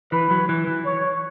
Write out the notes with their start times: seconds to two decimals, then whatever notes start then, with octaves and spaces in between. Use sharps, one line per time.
0.12 E3 B4
0.31 F#3
0.49 E3
0.67 E3
0.85 C#5